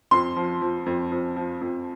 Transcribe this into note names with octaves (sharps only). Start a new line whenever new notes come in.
F2 C6
F3
F3
F2
F2
F3
F2